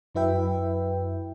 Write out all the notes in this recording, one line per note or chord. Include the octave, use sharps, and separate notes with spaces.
F#2 F#3 E4 B4 E5 G5